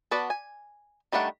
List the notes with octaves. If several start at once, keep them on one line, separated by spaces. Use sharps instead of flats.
B3 F#4 B4 D5 A5
G#5
D#3 G3 A3 D4 F#5